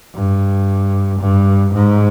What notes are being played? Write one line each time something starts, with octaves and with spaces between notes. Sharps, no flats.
G2
G2
G#2